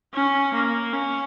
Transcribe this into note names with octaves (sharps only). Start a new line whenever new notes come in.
C#4
A#3
C#4